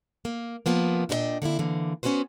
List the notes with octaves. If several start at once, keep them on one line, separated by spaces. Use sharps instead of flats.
A#3
C3 F3 A#3 B3
A#2 D4 A4 B4 D#5 G5
D3 A#3 C4 E4
D3 E3 A#3
B3 C#4 D#4 F#4 B4 C5